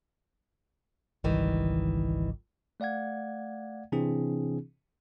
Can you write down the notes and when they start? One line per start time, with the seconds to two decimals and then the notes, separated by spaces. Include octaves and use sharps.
1.24 G#1 C#2 D#3 E3 G3
2.80 A3 D5 F5 F#5 G#6
3.92 C3 E3 C4 D4 E4 G#4